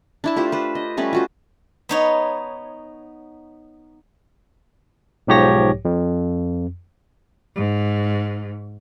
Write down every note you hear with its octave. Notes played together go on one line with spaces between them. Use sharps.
D4 E4 A5
A3 F4 G4 C5
B4 C5
D#5
G3 A3 C#4 B4
F4 F#4 C5
B3 D#4 C#5
B1 G#2 F3 G4 C#5 A#6
F2
G#2